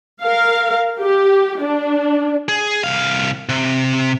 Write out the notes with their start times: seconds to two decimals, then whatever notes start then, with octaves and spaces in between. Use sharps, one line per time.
0.23 A#4 F5
0.99 G4
1.61 D4
2.49 G#4
2.84 C2 F5
3.49 C3